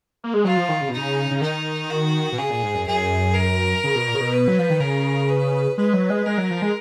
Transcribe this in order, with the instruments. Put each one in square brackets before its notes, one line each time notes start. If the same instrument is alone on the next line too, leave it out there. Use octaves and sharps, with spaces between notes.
[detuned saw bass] A#3
G#3
[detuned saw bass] F#3 [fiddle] F4
[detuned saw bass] F3
D#3
C#3
B2
[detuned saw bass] C#3 [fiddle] D#4
[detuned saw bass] C#3
[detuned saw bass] D#3 [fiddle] D#4
[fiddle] F#4
[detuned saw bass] B2
[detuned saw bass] C#3 [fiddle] G#4
[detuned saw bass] A#2
G#2
F#2
[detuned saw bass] F#2 [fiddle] G#4
[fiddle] A#4
[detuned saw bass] C#3
B2
A#2
C#3
B2
[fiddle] B4
[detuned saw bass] F#3
F3
D#3
[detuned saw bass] C#3 [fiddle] A#4
[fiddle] B4
[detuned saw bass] G#3 [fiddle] B4
[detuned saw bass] F#3
G#3
[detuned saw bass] G#3 [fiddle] A#4
[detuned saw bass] F#3
F3
G#3